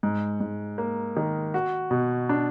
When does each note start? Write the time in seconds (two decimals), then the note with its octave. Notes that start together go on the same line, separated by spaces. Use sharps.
0.03 G#2
0.40 G#2
0.78 A#3
1.17 D#3
1.54 F#4
1.91 B2
2.29 D4